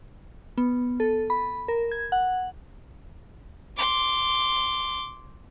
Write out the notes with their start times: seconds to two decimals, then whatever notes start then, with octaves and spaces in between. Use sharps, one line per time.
0.58 B3
1.00 A4
1.30 B5
1.68 A#4
1.91 G#6
2.12 F#5
3.77 C6 D6